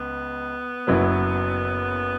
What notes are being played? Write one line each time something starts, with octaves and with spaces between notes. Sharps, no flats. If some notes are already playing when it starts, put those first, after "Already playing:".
Already playing: C#2 B3
F#1 F#2 F#3 E4 B4